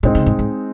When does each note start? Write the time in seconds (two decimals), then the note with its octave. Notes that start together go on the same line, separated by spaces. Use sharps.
0.03 A#2 G#3 C4 D#4
0.15 C#3
0.26 G#2
0.39 G#2